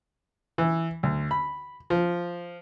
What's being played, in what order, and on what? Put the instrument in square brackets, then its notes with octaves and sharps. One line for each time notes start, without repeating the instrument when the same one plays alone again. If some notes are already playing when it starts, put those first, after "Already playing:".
[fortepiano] E3
D2
B5
F3